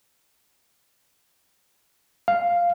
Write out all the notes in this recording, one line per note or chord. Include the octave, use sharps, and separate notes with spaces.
F5